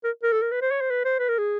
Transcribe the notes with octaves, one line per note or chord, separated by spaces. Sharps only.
A#4
A#4
A4
A#4
B4
C5
C#5
C5
B4
C5
B4
A#4
G#4